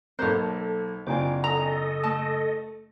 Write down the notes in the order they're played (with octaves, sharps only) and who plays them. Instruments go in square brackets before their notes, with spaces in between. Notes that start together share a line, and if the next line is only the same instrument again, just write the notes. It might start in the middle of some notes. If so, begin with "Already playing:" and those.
[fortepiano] B1 F#6 [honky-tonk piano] A#3 A4 [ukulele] C5 C#5
[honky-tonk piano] F#1 G#5 [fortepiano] C4 D4 F4 [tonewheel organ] D6
[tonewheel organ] A4 D#5 [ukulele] A#5
[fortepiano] A3 [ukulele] A5